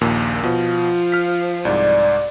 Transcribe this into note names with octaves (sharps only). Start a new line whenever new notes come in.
A#1 D#2 A#2
B2 F3
F6 B6
C2 G#2 D5